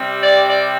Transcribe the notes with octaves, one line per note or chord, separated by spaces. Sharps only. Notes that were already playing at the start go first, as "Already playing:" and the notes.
Already playing: C3 G3 C4
D5
D5